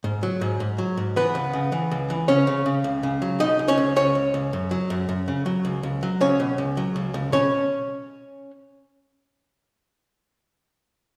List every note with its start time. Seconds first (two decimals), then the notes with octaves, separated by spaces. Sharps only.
0.04 G#2
0.23 F#3
0.41 G#2
0.60 G#2
0.78 F#3
0.97 G#2
1.16 E3 B3 B4
1.35 C#2
1.53 C#3
1.72 E3
1.91 C#2
2.10 E3
2.28 C#3 C#4 C#5
2.47 C#3
2.66 C#3
2.84 C#2
3.03 C#3
3.22 F#3
3.40 B2 D#4 D#5
3.59 C#2
3.68 C#4 C#5
3.78 C#2
3.96 C#2 C#4 C#5
4.15 C#2
4.34 C#2
4.53 F#2
4.71 F#3
4.90 F#2
5.09 F#2
5.28 C#3
5.46 F#3
5.65 C#2
5.83 C#2
6.03 F#3
6.21 C#2 C#4 C#5
6.40 B2
6.58 C#2
6.77 F#3
6.96 C#2
7.14 C#2
7.32 B2 C#4 C#5